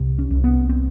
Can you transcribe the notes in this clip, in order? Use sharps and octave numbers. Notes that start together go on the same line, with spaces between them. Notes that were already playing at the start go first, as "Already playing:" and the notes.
Already playing: C2 C3
C#4
C2
B3
C4